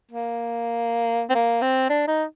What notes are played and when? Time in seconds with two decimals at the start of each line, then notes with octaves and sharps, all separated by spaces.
0.11 A#3
1.30 C4
1.35 A#3
1.62 C4
1.89 D4
2.08 D#4